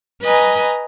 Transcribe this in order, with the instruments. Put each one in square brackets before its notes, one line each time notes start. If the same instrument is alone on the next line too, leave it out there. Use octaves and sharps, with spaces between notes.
[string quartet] B4 D#5 G#5 A#5